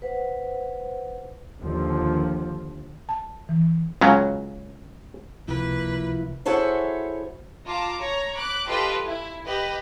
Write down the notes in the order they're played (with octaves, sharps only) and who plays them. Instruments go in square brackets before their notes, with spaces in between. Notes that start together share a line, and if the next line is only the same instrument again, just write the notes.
[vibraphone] B4 C5 F#5
[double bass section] D#2 D3 F3
[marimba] A5
E3
[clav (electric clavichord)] C#2 C#3 F#3
[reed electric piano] C#2 C3 [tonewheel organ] F3 E4 [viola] A#3 B4
[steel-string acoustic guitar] E4 F#4 G#4 A4 C5 C#5
[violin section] F4 A5 A#5 D6
C#5 A#5
B5 D6 F#6
F4 G4 A4 B4 D#5 A5
E4
G4 B4 D#5 B5